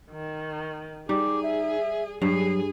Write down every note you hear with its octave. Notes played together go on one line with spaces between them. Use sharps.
D#3
G3 D#4 G#4 D6
E5
G2 F#3 G#4 C7